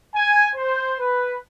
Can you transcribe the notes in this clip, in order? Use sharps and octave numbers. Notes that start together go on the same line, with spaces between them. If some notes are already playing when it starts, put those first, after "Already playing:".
G#5
C5
B4